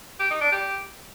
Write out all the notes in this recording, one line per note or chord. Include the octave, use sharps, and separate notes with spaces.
G4
D#4
D4
G4